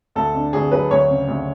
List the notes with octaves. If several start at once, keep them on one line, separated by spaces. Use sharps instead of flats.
D2 A4
D3
D2 G#4
F#3 B4
D2 C#5
C#3
D2